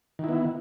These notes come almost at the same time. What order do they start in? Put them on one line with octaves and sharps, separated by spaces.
D#3 E4 B3